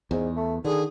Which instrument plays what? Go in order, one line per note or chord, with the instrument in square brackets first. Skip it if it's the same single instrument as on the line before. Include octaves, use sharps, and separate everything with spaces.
[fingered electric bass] E2 [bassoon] G#2
[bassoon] A3
[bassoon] D3 [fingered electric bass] D#3 [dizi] G#4